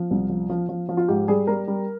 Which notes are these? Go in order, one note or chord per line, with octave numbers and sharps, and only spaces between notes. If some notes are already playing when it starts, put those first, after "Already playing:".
Already playing: F3
C2
F3
F3
F3
F3
F4
G#2 G4
G3 G#4
G3 A#4
G3